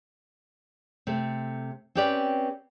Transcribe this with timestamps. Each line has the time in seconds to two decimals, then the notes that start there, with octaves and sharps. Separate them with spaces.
1.07 C3 A3
1.95 C4 C#4 G4 B4 D5